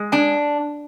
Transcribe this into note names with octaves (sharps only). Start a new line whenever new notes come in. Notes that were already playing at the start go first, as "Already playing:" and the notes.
Already playing: G#3
D4 G#5